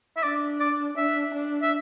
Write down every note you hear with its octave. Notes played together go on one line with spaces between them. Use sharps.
E5
D4 D5
D5
D4 E5
D4
E5